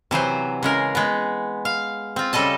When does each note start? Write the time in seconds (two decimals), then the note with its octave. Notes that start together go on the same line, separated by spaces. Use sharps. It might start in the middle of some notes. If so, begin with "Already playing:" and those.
0.11 C3 E3 F#3 C5
0.63 C#3 G#3 A#4
0.95 G#3 B3
1.65 F5
2.16 C4 F4
2.33 C#3 G3 A4 D#5 A5